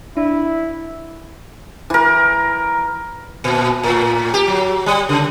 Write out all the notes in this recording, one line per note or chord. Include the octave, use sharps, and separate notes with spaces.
D4 E4
E3 A#4
A#2
A2
G4
F#3
G3
C#3